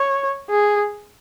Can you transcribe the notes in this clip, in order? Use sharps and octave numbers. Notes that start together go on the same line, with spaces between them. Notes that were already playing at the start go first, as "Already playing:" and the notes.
Already playing: C#5
G#4